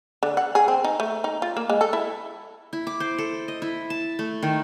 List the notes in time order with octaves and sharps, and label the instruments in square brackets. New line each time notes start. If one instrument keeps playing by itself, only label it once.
[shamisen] D3
F#5
G#4
C4
D#4
A3
D#4
F4
A#3
G#3
A4
E4
[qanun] E4
D6
C5
A4
D#5
E4
A5
A3
D#3